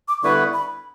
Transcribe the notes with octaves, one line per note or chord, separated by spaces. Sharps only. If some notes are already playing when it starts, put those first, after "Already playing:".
D6
D3 G3 B3 E4 B4 C#6
B5